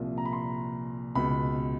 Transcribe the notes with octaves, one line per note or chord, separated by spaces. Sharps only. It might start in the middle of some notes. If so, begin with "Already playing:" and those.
Already playing: C2 A#2 F3
A#5
B5
C6
C#2 B2 B5